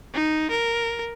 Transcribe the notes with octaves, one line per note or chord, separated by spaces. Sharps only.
D#4
A#4